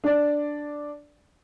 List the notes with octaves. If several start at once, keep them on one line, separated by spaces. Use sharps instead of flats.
D4 D5